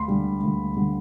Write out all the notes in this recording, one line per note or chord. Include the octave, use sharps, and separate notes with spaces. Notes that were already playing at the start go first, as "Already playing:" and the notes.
Already playing: D2 B5 C6
D3 G3
D2
D3 G3